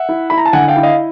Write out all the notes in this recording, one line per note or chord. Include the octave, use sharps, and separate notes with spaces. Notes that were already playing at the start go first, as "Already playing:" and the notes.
Already playing: E5 F#5
E4
E4 B5
A#5
A5
D3 F#5 G#5
F5 G5
E4
D#5 F5